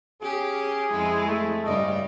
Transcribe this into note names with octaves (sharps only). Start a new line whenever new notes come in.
C#4 G4 G#4
F2 G#3 E4
A3
G2 C#3 D5 D#5